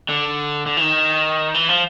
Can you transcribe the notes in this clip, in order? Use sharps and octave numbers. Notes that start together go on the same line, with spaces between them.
D3
D3
E3
D#3
E3
F3